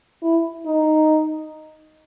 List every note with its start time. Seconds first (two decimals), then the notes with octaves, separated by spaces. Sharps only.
0.23 E4
0.66 D#4